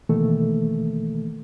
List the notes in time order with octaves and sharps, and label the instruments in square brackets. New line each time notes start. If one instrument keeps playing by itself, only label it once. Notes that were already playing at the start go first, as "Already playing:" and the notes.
[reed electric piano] B2 D#3 E3 A3 A#3 A4